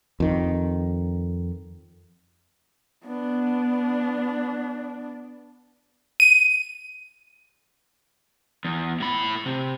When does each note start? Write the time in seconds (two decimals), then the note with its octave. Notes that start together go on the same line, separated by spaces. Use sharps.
0.20 F2 D#3
3.05 B3 D4
6.20 D#7
8.65 E2
9.00 A2 B5
9.46 C3